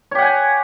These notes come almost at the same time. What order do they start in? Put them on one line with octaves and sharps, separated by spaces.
C#5 G4 F#5 G#5